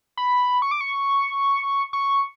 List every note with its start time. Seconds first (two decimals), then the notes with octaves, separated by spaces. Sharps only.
0.17 B5
0.62 C#6
0.71 D6
0.81 C#6
1.93 C#6